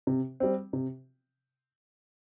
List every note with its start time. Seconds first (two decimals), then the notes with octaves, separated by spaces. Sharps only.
0.07 C3
0.40 G3 C4
0.73 C3